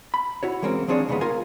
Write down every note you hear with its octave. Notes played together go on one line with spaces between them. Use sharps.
B5
E4 F#4 C#5
E3 G#3 A#3 C4 C#4
D#3 F3 C4 D4 G#4 C#5
D#2 C#3 G#3 A#3 B3 D#4
F4 A#4 F5 G#5